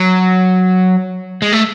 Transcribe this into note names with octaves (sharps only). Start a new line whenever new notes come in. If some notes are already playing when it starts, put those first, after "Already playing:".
Already playing: F#3
G#3
A3